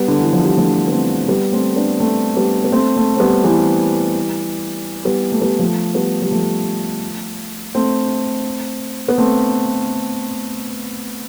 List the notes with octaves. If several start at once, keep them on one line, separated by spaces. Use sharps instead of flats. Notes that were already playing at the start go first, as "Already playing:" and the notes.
Already playing: G3 B3
D3
E3
F3
G3
F3 A3
B3
A3 C4
G3 B3
A3 C4
B3 D4
A3 C4
G3 B3
B3
A3 C4
A3 C4
C4
G3 B3
E3 G3
G3 B3
A3
G3 B3
F3 A3
G3 B3
G3
F3 A3
A3 C4
B3
A3 C4